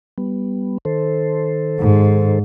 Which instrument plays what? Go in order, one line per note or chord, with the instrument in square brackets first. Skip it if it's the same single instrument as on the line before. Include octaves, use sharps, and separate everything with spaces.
[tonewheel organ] G3 B3
D#3 A4 C5
[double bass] G#2